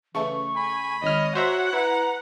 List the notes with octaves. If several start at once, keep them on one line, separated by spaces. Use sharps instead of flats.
C#3 E3 A3 C#6
G#5 B5
G#1 C#5 D#5 F6
F#4 C5 E5 F#5 A#5
E4 B4 A#5